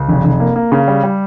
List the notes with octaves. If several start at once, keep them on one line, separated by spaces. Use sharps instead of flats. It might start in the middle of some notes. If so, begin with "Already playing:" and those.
Already playing: C#2
F1
F1
A#3
A#3
C#3
G3
G3